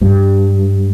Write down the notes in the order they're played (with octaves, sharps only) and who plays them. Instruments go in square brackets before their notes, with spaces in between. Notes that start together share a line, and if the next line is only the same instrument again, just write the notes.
[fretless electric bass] G2